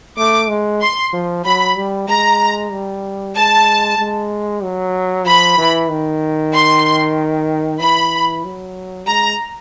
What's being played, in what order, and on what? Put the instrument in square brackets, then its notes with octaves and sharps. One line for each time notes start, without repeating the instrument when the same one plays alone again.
[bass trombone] A3 [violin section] D6
[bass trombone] G#3
[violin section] C6
[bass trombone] F3
[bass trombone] F#3 [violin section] B5
[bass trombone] G3
[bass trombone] G#3 [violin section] A#5
[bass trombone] G3
[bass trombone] G#3 [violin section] A5
[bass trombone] G#3
F#3
[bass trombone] F3 [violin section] B5
[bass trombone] E3
D#3
[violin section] C6
[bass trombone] E3 [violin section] B5
[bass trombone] F#3
[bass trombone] G#3 [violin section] A#5